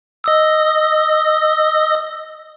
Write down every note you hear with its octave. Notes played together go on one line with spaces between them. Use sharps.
D#5 D#6 E6